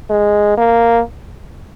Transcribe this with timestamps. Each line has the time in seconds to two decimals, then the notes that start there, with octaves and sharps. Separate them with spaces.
0.10 G#3
0.57 A#3